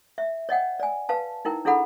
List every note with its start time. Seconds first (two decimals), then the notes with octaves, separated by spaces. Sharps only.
0.18 E5
0.49 C#5 D#5 F#5 G5
0.80 D5 G#5
1.09 B4 F5 A5
1.45 D#4 E4 A#4 G5
1.65 D4 E4 G#4 A4 F#5 B5